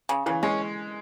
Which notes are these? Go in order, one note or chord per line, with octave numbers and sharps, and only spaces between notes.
C#3
C#3 E3
G#3 C#4